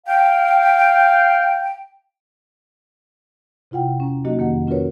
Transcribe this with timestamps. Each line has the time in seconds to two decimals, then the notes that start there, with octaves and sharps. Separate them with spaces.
0.06 F5 G5
3.71 C3 E4 F4 F#5 G5
3.98 E2 C#4 A#5
4.25 F#3 A#3 D#4 F#4 G4 D#5
4.38 F2 D#3 A#3 F#5
4.67 C#4 F4 F#4 A#4 B4 C#5